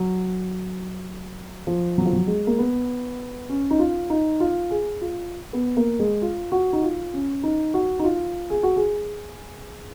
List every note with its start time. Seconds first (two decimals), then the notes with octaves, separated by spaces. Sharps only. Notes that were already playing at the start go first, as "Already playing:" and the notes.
Already playing: F#3
1.67 F3
1.98 F#3
2.06 F3
2.13 F#3
2.27 G#3
2.47 A#3
2.59 B3
3.49 C#4
3.71 D#4
3.79 F4
4.10 D#4
4.40 F4
4.71 G#4
5.01 F4
5.53 B3
5.77 A#3
5.99 G#3
6.22 F4
6.52 F#4
6.73 D#4
6.82 F4
7.13 C#4
7.43 D#4
7.74 F#4
7.99 D#4
8.04 F4
8.50 G#4
8.63 F#4
8.76 G#4